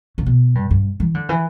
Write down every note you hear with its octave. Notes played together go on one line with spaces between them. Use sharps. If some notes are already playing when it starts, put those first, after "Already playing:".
C#3
B2
G2
G2
E3
D3
E3